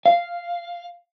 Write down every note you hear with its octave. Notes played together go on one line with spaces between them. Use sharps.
F5